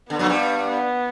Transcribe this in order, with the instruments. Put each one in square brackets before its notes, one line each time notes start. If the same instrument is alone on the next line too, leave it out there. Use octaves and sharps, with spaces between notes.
[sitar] D3 [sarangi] B3
[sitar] F#2 F#3
G2 G3
[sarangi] B3